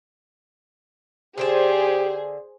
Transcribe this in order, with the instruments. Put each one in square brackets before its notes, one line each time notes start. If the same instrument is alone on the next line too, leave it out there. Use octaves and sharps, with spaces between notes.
[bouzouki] D3 G5 A5 [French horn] G4 [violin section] G#4 C5